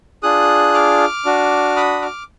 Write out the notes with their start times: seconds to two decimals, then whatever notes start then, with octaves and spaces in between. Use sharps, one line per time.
0.23 D4 F4 G#4 D#6 F#6
0.74 D6 F6
1.25 D4 F#4
1.76 B5 D#6
2.02 D6 F6